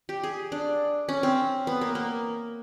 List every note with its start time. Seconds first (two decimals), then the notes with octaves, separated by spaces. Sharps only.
0.09 G4
0.23 G#4
0.52 D4
1.09 C#4
1.23 C4
1.67 B3
1.81 A#3
1.95 A#3